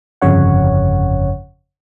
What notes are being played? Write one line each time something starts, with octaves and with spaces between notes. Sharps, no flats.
G1 F2 C#3 C#5 F#5